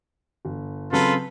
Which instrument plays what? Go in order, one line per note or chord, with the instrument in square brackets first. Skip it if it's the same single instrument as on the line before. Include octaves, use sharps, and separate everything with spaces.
[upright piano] G1
[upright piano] C#3 F#3 C4 [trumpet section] F4 A4 B4